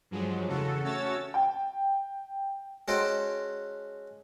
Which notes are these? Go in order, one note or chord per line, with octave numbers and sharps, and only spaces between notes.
G2 F3 F#3 G#3
E2 C#3 F#4 A4
A3 C#4 F#4 C#5 E6 A6
G5
G#3 C#4 F#4 A4 C5 G5